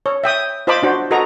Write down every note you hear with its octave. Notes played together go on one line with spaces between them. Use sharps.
C#5
E5 G5 D#6
F4 C5 D#5 A5 B5 D6
D4 F#4 C5
F#4 A4 B4 D#5 A#5